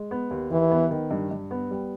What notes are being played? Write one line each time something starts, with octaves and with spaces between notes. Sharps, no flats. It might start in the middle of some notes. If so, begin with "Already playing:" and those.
Already playing: G#3
B3
D#2
D#2 E3
B3
D#3
G2
G2
B3
G3